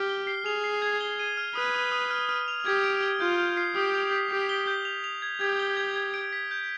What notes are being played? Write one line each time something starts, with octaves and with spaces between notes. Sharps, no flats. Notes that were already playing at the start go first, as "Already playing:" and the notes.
Already playing: G4 F6
G7
C7
G#4 F7
C7
G#6
G7
D#7
F6
B4 D#6
D#6
D#6
F6
F6
F7
G4 G#6
D7
G7
F4 G6
G6
C7
G4 D#6
F7
B6
G4 C7
G7
G6
F7
F7
G#6
G4 G#6
G7
G#6
G#6
D7
B6
G6